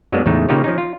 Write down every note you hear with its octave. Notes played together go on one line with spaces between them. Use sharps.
F#2 F#3 G#3 A#3 B3 D4
E2 A2 C#3 G#3 A3 D#4
C#3 A#3 D#4 F4 G4 C#5
F3 C#4 D#4
F4